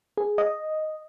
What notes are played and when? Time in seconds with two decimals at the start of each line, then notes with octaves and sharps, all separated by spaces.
0.17 G#4
0.38 D#5